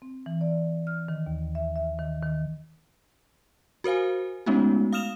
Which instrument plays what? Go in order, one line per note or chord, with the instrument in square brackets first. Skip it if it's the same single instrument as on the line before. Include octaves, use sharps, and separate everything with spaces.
[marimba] C4
E3
D5
F6
D#3
D#2
E5
E5
D#3
D#3
[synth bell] F#4 A#4 C5 F5 G#5
G#3 A3 B3 C#4 D#4 F#4
F5 D#6 F6 E7 F7